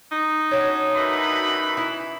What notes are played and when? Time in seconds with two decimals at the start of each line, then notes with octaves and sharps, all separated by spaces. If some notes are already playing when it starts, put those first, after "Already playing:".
0.12 D#4
0.51 C#4 D4 F#4
0.96 F#2 E3 B5
1.77 E4